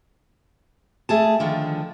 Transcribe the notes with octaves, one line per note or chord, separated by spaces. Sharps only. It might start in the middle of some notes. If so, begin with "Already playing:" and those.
A3 G#4 A5
D3 D#3 F3